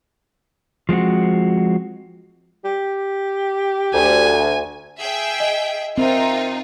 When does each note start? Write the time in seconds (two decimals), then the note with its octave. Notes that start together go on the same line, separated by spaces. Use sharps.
0.89 F3 G#3 C4 F#4
2.65 G4
3.94 D2 G#5
5.00 G#4 E5 G5
5.40 D#5
5.98 C4 D#4 F4 A#4 E5